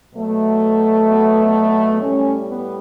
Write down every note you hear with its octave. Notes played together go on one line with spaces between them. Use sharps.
B2 F#3 A3
B3
B3
A2 G3 A3 C#4
B3